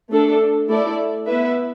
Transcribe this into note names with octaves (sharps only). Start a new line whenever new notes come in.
A3 D4 A4
A3 E4 A4 D5
B3 E4 B4 E5